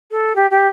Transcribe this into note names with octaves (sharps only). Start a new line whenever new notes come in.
A4
G4
G4